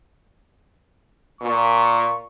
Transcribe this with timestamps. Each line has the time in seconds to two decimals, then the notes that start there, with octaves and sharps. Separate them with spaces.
1.41 A#2 C#6